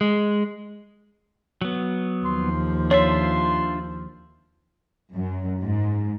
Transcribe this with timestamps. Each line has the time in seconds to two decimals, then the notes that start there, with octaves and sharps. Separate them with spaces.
0.01 G#3
1.62 F#3 B3
2.25 D#2 F3 C6
2.91 D4 F4 C#5 E5 C6
5.14 F#2
5.62 G#2